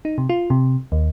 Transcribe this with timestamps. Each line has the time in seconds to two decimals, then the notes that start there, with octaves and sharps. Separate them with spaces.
0.05 D#4
0.18 C3
0.29 F4
0.50 C3
0.92 D#2